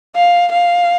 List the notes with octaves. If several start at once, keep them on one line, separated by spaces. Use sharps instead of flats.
F5
F5